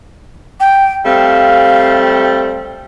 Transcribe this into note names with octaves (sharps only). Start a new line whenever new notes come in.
G5
G3 A3 C4 F5